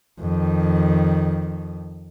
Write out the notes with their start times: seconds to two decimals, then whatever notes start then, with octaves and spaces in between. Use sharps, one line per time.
0.20 F2 D#3